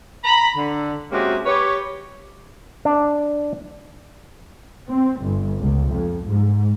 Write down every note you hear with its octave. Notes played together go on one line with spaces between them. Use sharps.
A#5 B5
D3
C3 G#3 A#3 C#4 F#4 G4
G4 B4 C#5
D4
C4
G1
C#2
F2
G#2